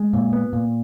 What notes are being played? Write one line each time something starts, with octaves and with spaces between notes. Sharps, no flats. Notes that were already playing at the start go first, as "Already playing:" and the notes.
Already playing: G#3
A#2
B3
A#2